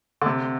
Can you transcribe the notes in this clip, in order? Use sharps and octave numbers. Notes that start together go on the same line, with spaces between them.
D3
C3